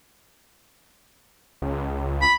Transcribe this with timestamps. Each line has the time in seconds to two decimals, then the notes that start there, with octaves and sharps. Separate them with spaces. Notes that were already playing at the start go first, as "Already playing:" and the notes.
1.62 C#2
2.22 B5